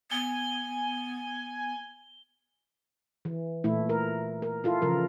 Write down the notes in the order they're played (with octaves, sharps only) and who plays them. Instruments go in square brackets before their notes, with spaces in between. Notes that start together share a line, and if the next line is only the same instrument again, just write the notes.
[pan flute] B3 [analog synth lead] G#5 [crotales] G7
[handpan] E3
A#2 E3 A3 E4
A#4
A#4
E4 F4 A4
C#3 E3 F3 A#4